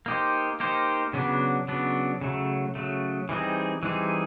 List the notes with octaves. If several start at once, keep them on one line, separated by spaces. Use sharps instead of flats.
A#3 D#4 G4 C5
A#3 D#4 G4 C5
C#3 F#3 B3 D4
C#3 F#3 B3 D4
C#3 F#3 A3
C#3 F#3 A3
E3 G3 C4 D#4 G#4
E3 G3 C4 D#4 G#4